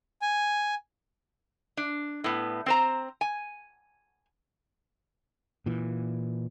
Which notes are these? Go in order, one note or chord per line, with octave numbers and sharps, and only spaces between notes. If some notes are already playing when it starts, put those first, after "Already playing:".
G#5
D4
A2 B3
C4 C5 A#5
G#5
A#2 E3